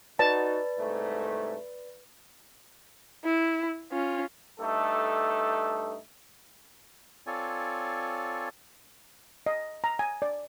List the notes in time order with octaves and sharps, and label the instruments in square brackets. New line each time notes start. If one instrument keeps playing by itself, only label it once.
[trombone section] D#4 F#4 [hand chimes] B4 D5 A6 [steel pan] A5
[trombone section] C2 G#2 A3
[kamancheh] E4
C#4 F4
[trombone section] G2 A3 D#4 A4
[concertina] C4 F4 A4 C#5 D5 G#5
[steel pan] D#5
A#5
G#5
D5